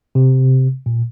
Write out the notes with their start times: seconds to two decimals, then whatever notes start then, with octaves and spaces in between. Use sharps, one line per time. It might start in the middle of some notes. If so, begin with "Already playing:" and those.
0.15 C3
0.86 A#2